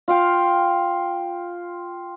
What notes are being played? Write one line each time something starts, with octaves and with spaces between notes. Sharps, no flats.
F4 F5 G5